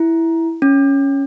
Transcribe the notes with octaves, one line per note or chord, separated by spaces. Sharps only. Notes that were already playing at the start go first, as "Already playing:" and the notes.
Already playing: E4
C#4